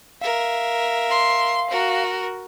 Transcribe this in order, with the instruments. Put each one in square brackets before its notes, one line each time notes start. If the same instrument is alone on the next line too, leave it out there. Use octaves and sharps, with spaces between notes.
[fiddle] A#4 E5 [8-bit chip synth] F5
[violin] C6
[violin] F#4 [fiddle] A#4